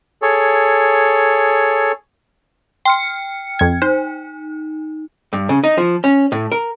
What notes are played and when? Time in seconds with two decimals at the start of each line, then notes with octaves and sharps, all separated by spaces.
0.22 G#4 A4 C#5
2.85 G5 C6 F6 C#7
3.59 F2 G#6
3.82 D#4 C5
5.33 G2
5.49 C#3
5.64 D#4
5.78 F3
6.04 C#4
6.32 A2
6.52 A#4